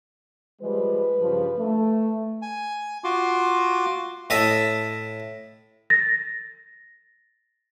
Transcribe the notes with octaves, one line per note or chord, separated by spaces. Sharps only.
F3 G3 G#3 B4
G2 C#3 F3
A3
G#5
F4 F#4 C6 D6
A2 D#5 E5 A5
A6 A#6